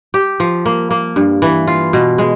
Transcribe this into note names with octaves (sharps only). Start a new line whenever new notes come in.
G4
F3
A#3
A#3
G2
E3
F4
B2
G#3